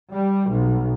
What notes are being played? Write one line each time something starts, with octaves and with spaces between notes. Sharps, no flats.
G3
B1